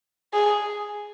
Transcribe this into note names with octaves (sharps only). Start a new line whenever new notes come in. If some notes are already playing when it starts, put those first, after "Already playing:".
G#4